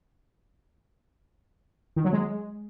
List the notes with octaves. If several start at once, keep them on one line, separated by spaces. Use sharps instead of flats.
D#3
F#3
G#3